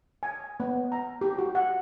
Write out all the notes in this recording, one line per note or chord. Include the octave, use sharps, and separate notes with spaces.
G#5
B3
A#5
G4
F#4
F#5